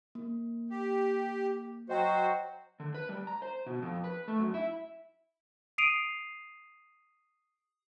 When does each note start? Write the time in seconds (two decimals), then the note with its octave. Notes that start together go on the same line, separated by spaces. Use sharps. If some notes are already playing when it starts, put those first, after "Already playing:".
0.15 A#3
0.70 G4
1.89 F#3 F#4 C5 D#5 G5
2.80 D3
2.95 B4
3.09 G3
3.27 A#5
3.42 C5
3.66 B2
3.82 F2
4.04 B4
4.28 A3
4.39 F#2
4.54 E4
5.78 D#6 C7 D7 D#7 F7